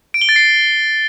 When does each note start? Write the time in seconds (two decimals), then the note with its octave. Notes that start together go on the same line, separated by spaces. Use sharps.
0.14 D7
0.22 G7
0.29 A6
0.36 C7